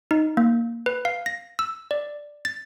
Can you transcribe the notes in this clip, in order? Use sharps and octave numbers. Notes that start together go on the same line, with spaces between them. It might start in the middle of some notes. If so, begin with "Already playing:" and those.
D#4
A#3
B4
F5
A#6
E6
D5
A6